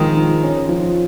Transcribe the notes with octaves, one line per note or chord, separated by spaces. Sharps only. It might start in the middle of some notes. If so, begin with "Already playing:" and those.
Already playing: D#3 F3 G#3 C4
D#4
C#4
F3